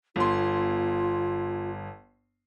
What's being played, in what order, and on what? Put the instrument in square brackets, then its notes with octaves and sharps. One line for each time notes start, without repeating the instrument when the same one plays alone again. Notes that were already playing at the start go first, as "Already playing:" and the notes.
[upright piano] G1 C6 [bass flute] F4